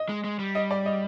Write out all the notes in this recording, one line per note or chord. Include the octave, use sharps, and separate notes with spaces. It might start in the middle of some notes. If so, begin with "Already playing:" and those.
Already playing: D#5
G#3
G#3
G3
D#5
D5
D#5